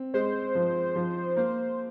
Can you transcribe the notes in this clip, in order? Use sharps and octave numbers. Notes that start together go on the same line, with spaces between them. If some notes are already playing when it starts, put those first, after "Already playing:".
Already playing: C4
G#3 C5
F3
F3
A#3 C5